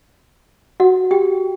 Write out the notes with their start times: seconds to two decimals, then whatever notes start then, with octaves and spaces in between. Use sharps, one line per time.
0.80 F#4 F#5
1.11 G4 G5